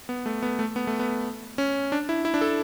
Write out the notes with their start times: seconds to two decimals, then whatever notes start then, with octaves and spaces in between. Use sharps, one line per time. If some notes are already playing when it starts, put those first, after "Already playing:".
0.09 B3
0.26 A3
0.43 B3
0.59 A3
0.76 B3
0.87 A3
0.99 B3
1.58 C#4
1.92 D4
2.09 E4
2.25 E4
2.34 D4
2.41 A4